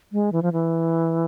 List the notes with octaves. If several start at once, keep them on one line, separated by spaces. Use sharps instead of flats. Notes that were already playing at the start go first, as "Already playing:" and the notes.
G#3
E3
F3
E3